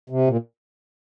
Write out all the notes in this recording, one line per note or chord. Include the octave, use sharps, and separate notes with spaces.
C3
A#2